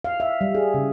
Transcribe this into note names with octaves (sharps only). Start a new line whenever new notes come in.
F5
E5
G3
G#4
C#3